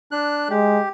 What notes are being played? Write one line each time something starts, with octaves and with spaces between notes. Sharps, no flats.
D4 F#6
G#3 G4